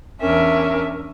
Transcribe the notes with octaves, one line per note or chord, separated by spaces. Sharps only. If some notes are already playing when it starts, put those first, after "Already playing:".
E2 C#4 D4 A#4 E5